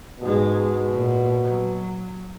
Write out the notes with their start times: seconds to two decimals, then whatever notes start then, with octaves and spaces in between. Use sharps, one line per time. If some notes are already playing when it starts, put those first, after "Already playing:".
0.20 G#2 B2 G#3
0.91 A#2
1.43 F#3